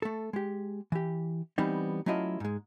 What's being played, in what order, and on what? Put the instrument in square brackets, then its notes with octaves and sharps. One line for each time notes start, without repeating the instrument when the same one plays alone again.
[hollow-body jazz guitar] A3 A4
G#3 G4
E3 G4
E3 G3 B3 C4 D#4
F#3 A3 C#4 E4 F4 D#5
G#2 G#3